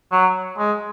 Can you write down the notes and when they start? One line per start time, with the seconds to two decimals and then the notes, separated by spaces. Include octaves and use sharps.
0.12 F#3
0.58 G#3